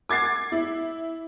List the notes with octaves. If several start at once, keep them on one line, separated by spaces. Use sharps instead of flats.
D6 G#6 A6 C7
E4